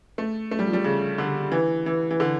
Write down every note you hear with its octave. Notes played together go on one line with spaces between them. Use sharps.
A3
A3
G3
F3
G3
C#3
D3
E3
E3
E3
D3